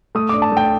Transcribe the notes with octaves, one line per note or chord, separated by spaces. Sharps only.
A3 D#6
D4 D6
A5
A3 G5